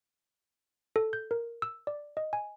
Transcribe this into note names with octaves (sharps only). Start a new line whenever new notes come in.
A4
G6
A#4
E6
D5
D#5
G#5